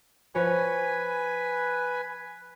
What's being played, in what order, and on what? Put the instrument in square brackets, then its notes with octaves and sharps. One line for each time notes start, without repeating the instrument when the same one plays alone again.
[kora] F3 C#5 F#5 [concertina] B4 G#5